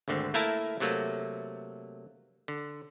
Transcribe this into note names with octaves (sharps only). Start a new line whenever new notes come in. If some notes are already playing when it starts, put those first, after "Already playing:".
G#1 D2 D3 C4
A3 A#3 E4 A#4 E5 A5
C3 F#3 A3 A#3
D3